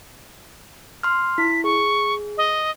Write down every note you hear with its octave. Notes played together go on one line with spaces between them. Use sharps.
C6 F6
E4 B6
G#4 C#6
D#5